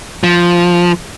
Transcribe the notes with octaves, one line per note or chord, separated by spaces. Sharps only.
F3